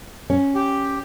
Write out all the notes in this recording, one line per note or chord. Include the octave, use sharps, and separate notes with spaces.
C#4
G4